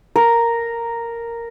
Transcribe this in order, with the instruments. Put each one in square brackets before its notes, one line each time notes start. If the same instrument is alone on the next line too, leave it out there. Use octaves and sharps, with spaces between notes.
[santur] A#4